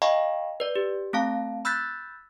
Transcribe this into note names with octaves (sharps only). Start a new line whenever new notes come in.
D#5 F5 G5 A5 B5 C#6
B4 D5
G4
A3 C4 F5 A5
B5 E6 F#6 G6 A6 B6